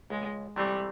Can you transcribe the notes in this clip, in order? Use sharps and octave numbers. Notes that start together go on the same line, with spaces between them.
C#2 G#3
C3 E3 G3 A3 C4